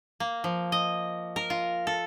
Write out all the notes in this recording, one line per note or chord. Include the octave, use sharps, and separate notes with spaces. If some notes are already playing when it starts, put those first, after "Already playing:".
A#3
F3
D#5
A#4
F4
A4